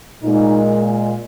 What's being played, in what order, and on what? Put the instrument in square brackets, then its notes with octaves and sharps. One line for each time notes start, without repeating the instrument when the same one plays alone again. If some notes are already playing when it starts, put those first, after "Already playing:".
[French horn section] A#2 G#3 D#4